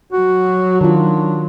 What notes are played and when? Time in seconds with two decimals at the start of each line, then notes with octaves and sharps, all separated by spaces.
0.12 F#3 F#4
0.81 D#3 D4 F4